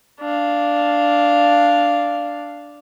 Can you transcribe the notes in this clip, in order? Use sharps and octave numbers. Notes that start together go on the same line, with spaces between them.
D4 F5